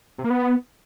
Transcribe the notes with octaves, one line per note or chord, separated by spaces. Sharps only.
C3
A#3
B3